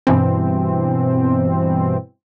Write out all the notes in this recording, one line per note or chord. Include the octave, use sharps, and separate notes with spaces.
G2 B2 E3 C4